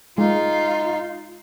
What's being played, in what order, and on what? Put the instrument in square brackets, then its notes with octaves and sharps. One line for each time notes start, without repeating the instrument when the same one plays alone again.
[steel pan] G#3 [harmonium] D#4 [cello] F4